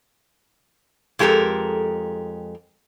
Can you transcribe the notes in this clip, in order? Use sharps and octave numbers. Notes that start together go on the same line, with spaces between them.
F2 G#3 G4 A4 A#4